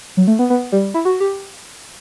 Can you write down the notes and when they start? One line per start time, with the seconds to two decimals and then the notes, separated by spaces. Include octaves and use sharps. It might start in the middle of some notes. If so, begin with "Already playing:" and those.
0.17 F#3
0.27 A3
0.39 B3
0.50 B3
0.72 G3
0.94 E4
1.05 F#4
1.20 G4